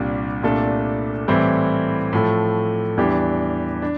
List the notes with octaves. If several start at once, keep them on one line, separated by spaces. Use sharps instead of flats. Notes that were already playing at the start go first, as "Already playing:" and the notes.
Already playing: C2 A#2 G3 D4
C2 A#2 A3 D4 A4
A2 E3 G3 C4 E4
A2 F3 A3
E2 E3 G3 D4 G4
D4